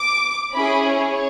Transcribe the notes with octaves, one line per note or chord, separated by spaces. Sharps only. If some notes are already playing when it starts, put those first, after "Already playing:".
Already playing: D6
C#4 E4 G#4 B5
C#5